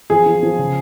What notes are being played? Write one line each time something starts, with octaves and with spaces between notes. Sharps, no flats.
F3 G#4
F3
F3
C#3